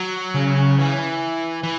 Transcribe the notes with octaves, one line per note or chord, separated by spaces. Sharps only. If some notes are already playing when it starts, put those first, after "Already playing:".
Already playing: F#3
C#3
E3
E3